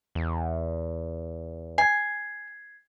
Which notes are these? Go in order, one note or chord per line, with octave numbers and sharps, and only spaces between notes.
E2
G#5 G#6 C7